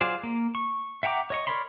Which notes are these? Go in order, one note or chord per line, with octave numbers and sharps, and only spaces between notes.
F#3 F4 G#4 C5 D5
A#3
C#6
E5 F#5 G5 A#5 D6
C#5 D#5 C#6
A#4 C#5 D5 B5 C6